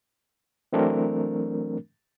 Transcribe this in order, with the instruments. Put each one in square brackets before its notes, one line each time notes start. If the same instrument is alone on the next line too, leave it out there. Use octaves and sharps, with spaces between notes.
[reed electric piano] E3 F#3 A3 C4 D4 A#4